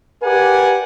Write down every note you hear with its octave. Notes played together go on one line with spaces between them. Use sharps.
G4 A#4 B4 D5 F#5 G#5